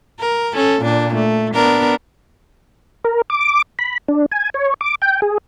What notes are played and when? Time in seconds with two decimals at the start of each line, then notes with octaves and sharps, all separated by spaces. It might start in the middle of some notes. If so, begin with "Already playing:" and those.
0.20 A#4
0.54 C#4 A4
0.83 A#2 D4
1.15 A3
1.55 B3 D4 A#4
3.04 A#4
3.30 D6
3.79 B5
4.08 D4
4.31 G#5
4.54 C#5
4.81 D6
5.02 G5
5.22 G#4